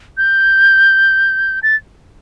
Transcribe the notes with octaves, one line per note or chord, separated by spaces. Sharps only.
G6
A6